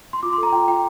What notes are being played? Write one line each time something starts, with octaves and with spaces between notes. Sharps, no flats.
C6
F4 D6
C6
A4
A#5
F4 G5
F4 G5